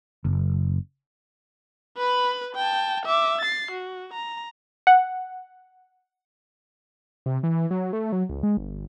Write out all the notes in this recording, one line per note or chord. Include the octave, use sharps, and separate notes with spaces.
F#1
B4 B5
G5 A5
E5 D6
A6 C7
F#4
A#5
F#5
C3
E3
F#3
A3
F#3
C#2
G#3
G1